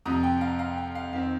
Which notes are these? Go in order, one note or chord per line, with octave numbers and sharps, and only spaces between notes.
F2 C3 F3 A#5 D#6
G5
F5 A#5
F5 A#5
G5
F5
F2 D#3 C4 F5